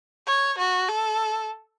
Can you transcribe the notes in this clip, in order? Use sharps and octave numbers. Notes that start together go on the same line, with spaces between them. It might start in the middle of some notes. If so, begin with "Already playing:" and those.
C#5
F#4
A4